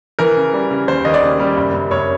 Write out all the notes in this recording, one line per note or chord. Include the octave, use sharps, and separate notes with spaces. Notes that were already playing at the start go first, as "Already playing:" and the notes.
E3 A#4
C#3
G3
C#3
D#2 C5
D#2 D#5
D5
C#3
G3
F#1
F#1
F#1 C#5